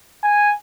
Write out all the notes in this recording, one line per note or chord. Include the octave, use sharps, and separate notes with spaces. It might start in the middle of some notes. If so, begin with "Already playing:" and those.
G#5